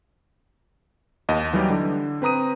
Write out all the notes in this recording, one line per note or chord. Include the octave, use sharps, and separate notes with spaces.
D#2 D#5
E3 F#3 G3 D#4 G4
D3
C4 B4 A#5 D#6 D#7